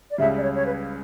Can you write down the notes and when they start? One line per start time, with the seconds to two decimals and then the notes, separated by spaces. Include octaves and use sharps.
0.11 D5
0.18 C#2 C#3 G3 E5
0.37 D5
0.42 C#5
0.55 C#5
0.66 B4